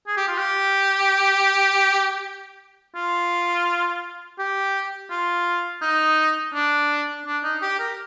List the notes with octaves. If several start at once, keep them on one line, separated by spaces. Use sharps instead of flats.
G#4
G4
F4
G4
F4
G4
F4
D#4
D4
D4
D#4
G4
A#4